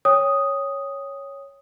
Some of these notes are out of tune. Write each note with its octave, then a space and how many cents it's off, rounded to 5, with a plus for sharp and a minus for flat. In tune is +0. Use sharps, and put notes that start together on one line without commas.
C#5 +0 G5 +30 D#6 +0